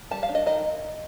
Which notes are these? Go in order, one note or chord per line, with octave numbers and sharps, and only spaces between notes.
G3 A5
F5
D4
D#5
D#3 D#5